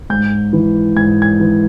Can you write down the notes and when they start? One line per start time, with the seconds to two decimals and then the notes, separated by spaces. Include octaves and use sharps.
0.10 G#2 G6
0.53 E3
0.96 G#2 G#6
1.22 G#6
1.40 E3